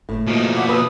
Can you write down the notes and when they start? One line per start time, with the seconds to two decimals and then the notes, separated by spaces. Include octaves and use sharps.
0.09 F#1 A2
0.27 B2 F3 A#3 D#5
0.55 E5 F#5 D6
0.69 B4 D#6 E6